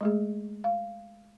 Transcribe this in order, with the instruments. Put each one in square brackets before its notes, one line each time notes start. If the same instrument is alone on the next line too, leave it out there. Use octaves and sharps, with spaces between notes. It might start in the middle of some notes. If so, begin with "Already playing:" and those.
[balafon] G#3 A3 G#4
F5